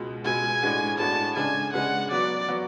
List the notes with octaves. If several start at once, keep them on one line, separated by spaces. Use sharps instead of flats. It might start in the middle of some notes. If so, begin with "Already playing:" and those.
Already playing: C#2 B2 G#3
C#2 B2 G#3 G#5
A2 G#3 D4 F#4
A2 G#3 D4 F#4 A5
C#3 G#3 D4 G#5
C#3 G#3 D4 F#5
F#3 B3 F#4 D5
F#3 B3 F#4